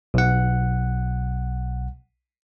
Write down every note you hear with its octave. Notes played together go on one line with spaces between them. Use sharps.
B1 F#5